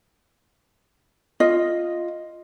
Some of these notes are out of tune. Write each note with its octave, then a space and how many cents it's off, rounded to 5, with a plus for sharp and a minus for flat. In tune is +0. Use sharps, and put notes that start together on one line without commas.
F4 -5 D#5 +0